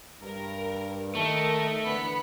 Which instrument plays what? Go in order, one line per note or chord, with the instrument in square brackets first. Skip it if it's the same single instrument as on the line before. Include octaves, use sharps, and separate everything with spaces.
[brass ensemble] G2 [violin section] A#4
[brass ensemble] D#3 A5 [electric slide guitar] A3 [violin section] A#4 D#5
[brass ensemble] D3 E3 [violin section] B3 B5 C#7